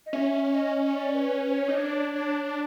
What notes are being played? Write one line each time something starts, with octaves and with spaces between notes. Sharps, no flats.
D#5
C#4 E5
D#5
D5
B4
B4
C5
C#5
D#4
D4
D4